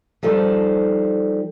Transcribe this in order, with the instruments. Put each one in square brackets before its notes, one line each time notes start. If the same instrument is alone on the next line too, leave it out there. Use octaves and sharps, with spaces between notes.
[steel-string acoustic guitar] F3 G3 D#4 A4 C5